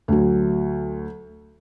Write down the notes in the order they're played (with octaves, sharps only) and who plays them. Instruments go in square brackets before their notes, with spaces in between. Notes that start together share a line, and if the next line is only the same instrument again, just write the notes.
[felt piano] D2 F#3